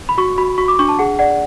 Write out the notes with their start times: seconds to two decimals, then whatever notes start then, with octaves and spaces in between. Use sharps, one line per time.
0.09 B5
0.18 F#4 C#6
0.38 F#4 B5
0.58 F#4 C#6
0.68 D6
0.79 D4 C#6
0.88 A5
0.99 G#4 F#5
1.19 D5 F#5